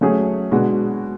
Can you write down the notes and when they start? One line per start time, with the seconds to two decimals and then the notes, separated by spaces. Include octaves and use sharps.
0.01 F#3 A3 C#4 G#4 C#5
0.51 B2 G#3 D4 F#4